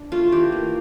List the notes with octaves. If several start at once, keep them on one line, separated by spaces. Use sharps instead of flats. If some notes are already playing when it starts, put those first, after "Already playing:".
Already playing: D4
A3 F4
E3 G4
A#3